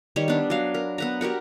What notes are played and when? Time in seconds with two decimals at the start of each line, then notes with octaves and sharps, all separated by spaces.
0.16 D#3 G3 C#5
0.28 B3 D4
0.50 F#3 F5
0.74 A#4
0.98 B3 B4 A#5
1.21 F#4 G4 A#4 F#5